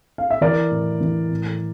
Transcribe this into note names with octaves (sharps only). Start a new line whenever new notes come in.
F5
E5
E3 A#4 D5
A2
E3
A2